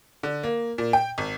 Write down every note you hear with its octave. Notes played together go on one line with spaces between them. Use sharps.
D3
A#3
A#2
G5
G#1